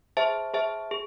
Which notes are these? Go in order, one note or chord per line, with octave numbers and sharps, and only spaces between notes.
G#4 C5 E5 A5
G#4 C5 E5 A5
G#4